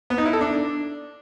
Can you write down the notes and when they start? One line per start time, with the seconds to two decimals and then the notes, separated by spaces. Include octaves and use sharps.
0.10 B3
0.18 D#4
0.26 E4
0.33 A4
0.41 D4